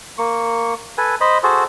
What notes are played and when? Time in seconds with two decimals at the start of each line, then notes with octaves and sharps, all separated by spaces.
0.18 A#3 C#6
0.98 A4 B4 G#5
1.21 C5 D#5 B5
1.43 F#4 G#4 A4 C5